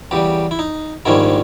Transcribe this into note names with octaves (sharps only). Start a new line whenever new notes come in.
E2 C#3 G3 G4
E4
D#4
A#1 G#2 D#3 G3 C#4 E4